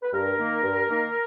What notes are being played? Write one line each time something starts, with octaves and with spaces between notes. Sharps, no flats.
B4
G2 A#4
D#3 A#3
G2
D#3 A#3